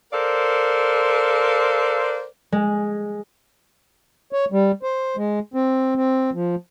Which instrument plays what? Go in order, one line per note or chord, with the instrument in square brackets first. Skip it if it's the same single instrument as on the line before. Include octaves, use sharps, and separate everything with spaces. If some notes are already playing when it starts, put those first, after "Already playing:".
[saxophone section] A4 A#4 C5 D5 F5
[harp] G#3
[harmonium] C#5
G3
C5
G#3
C4
C4
F3